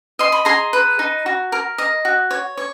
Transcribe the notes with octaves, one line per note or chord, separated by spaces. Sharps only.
D#5 C6
B5
G#4 A#5 C6
B4
D#4
F#4
A#4
D#5
F#4
C#5
C#5